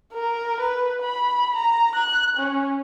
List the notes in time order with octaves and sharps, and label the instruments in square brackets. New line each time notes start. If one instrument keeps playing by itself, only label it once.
[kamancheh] A#4
B4
B5
A#5
F#6
C#4